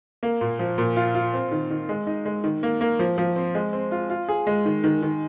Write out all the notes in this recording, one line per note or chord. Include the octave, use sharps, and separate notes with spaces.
A#3
A#2
F3
A#2
F4
F4
C4
D#3
D#3
G#3
D#4
G#3
D#3
A#3
A#3
F3
F3
C4
G#3
C4
F4
F4
G#4
G#3
D#3
D#3
D#3